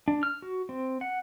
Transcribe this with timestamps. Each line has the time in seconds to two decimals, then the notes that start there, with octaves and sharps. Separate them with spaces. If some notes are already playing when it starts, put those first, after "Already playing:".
0.08 D4
0.23 F6
0.42 F#4
0.69 C4
1.01 F#5